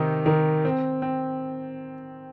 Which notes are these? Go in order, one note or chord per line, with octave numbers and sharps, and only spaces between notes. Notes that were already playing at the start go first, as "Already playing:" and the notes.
Already playing: C3 D#3 D#4
D#3
C4
C4